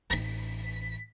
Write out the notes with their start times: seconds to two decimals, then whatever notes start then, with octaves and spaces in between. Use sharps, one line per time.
0.10 A1 D#4 B6